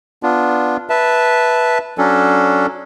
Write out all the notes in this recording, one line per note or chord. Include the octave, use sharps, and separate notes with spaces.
B3 D4 F4
B4 E5 A5
F#3 C#4 D4 A4